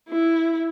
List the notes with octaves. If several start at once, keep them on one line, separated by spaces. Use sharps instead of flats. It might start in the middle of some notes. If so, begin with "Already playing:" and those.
E4